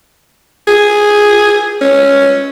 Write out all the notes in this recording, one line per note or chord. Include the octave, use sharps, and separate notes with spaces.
G#4
C#4